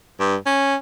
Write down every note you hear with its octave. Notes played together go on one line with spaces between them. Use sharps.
G2
C#4